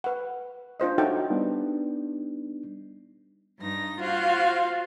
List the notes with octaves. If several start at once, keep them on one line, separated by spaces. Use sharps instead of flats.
B4 F#5
D4 F4 C5 D#5
D#4 F#4 A4 C#5 E5 G5
G3 B3 D4 D#4
G2 D#4 A#6
F4 F#4 C5 F5